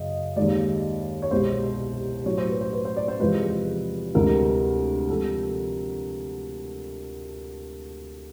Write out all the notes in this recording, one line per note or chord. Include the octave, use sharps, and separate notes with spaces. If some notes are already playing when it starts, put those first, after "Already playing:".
Already playing: F#2 C#3 F#3 D#5
D#2 D#3 G#3 D5
C#5
C2 B2 G#3 C5
A2 F#3 C#5
C5
B4
C5
B4
C5
D5
C5
E2 C3 F3 G#3 B4
D2 C3 E3 G#3 A#4
C3 F3 G#3 A4